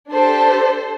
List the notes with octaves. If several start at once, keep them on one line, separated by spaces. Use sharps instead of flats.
D4 G4 A4 C5